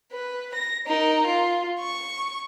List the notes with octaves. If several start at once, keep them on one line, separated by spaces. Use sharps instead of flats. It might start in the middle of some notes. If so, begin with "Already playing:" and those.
B4
A#6
D#4 A#4
F4
C#6